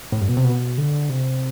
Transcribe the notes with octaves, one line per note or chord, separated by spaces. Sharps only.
A2
G2
B2
C3
B2
D3
C3